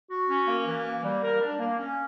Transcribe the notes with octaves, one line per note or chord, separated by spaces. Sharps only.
F#4
C#4
A#3
E3
A#3
G3
A#4
D4
A#3
C#4